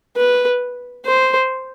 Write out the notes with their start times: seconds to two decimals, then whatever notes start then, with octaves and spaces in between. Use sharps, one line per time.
0.16 B4
1.05 C5